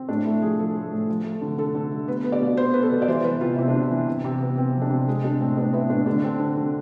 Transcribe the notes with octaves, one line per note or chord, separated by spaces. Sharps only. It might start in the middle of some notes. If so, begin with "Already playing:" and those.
Already playing: C4
A2 D4
A3 E4
F3 G#4
F3 A4
A3
A2
F3
A3
D3
D3 A4
D3
A3
B3 B4
B3
D5
B2
B3 C5
B3 B4
A4
B2
D5
E3 C5
E3 B4
C3 F4
C3 E4
D4
C3
E4
E3
C3
C3
B3
B3 C4
F3
D4
C3
G#3
G#3 D4
A2 C4
B3 D4
B3 E4
A2 D4
D3 D4
C4
D3
D3